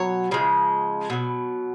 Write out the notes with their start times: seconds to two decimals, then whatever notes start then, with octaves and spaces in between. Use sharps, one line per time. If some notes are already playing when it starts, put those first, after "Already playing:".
Already playing: B2 F#3 C#5
0.31 C#3 F3 G#3
1.10 B2 F#3